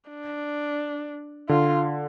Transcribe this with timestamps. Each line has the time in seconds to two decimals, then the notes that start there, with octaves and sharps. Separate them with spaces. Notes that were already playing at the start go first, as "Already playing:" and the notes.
0.10 D4
1.49 D3 F4